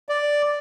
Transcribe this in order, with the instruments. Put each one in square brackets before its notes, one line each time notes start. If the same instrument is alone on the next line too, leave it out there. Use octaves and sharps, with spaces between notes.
[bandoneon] D5